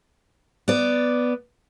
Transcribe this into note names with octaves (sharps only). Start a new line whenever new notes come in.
B3 D5